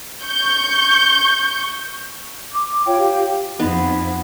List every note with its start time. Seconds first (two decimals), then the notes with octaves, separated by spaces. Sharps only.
0.24 C#6 G6
2.52 D6
2.86 F4 C#5 F5 G5
2.99 G4 F5
3.59 F2 B3 D#4 F#5